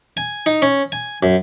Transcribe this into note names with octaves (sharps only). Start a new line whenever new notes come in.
G#5
D#4
C#4
G#5
F#2